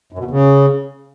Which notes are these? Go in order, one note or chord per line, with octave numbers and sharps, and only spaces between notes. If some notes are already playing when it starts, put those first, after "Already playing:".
F#2
B2
E2
C#3